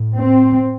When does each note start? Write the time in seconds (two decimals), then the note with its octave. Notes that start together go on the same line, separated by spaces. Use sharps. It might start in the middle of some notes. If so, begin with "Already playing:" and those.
Already playing: A2
0.17 C4